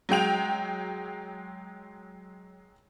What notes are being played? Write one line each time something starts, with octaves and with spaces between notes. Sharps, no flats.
F#3 G#3 G5 F7